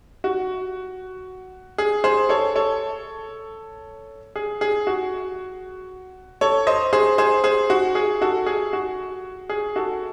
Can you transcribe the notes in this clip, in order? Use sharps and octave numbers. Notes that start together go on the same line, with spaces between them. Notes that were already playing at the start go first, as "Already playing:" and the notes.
F#4
G#4
G#4 C5
A4 C#5
A4 C#5
G#4
G#4
F#4
A4 C#5
C5 D#5
G#4 C5
G#4 C5
G#4 C5
F#4
G#4
F#4 A4
G#4
F#4
G#4
F#4 A4